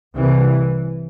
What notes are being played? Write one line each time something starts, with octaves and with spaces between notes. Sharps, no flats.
C2 C3 E3